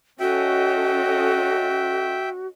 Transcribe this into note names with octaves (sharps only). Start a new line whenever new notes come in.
C#4 F#4 A4 D#5 E5 G5